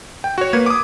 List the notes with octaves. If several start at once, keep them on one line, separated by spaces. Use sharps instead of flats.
G5
F#4 C#5
A#3 B4 G#6
D6 D#6